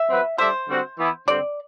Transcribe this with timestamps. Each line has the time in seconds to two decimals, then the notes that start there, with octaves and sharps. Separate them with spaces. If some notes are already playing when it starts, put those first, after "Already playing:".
Already playing: E5
0.08 F#3 C4 F#4 B4
0.38 G3 D4 A4 C5 E5
0.68 D3 G3 C4 F#4
0.98 E3 B3 E4
1.27 G2 D3 G3 C4 D5